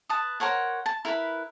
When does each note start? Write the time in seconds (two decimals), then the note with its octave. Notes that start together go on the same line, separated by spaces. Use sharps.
0.09 B4 A5 D#6
0.40 A#4 C5 C#5 F#5
0.86 A5
1.05 E4 A#4 B4 B5